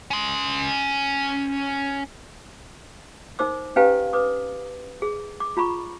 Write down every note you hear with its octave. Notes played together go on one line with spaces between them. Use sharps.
C#4 C6
D#4 A#4 C5 D6 E6
C#4 G4 B4 F5 G#5 A#5
B4 D6 D#6
G#4
D6
F4 A#5 B5 C#6